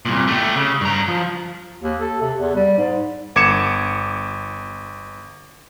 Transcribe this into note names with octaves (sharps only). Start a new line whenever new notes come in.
C2 A#2
A3 G4
C#3
G2 A#5
F3
D#2
A4
C3
E2
G3
G#2
G1 D6 G#6 C#7 E7